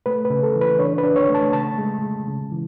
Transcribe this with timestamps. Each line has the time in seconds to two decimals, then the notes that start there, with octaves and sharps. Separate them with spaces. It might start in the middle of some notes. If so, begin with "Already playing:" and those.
0.06 A3 B4
0.25 B4
0.30 C#3
0.43 A4
0.56 E3
0.61 B4
0.79 D4 C#5
0.98 B4
1.04 D4
1.16 C#5
1.29 A3
1.35 A5
1.53 C#3 A5
1.78 G#3
2.02 G#3
2.27 C#3
2.52 E3